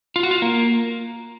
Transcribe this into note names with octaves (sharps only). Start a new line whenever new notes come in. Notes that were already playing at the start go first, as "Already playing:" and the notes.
F4
F#4
F4
A#3